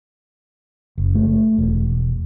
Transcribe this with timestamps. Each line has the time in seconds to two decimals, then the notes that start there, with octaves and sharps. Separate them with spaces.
0.98 F#1
1.15 A3
1.58 E1